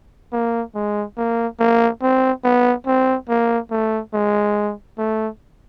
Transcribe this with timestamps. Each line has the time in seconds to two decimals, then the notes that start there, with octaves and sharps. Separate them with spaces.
0.33 A#3
0.75 G#3
1.18 A#3
1.60 A#3
2.02 C4
2.44 B3
2.87 C4
3.29 A#3
3.71 A3
4.14 G#3
4.98 A3